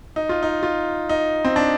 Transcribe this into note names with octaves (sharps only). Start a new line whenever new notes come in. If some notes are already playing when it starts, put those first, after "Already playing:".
D#4
F4
D#4
F4
D#4
C4
D4